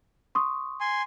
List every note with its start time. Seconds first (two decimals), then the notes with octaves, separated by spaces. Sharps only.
0.35 C6 C#6 D#6
0.80 G#5 C6